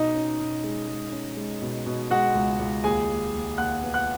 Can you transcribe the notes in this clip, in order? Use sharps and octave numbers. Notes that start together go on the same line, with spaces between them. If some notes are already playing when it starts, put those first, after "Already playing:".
Already playing: B2 D#4 D#5
C#4
B2
G#3
G#3
C#4
G#3
B2
B2
G#3 F#4 F#5
C#2
C#2
D#2 G#4 G#5
D#2
D#2
D#2 F#5 F#6
B3
F#5 F#6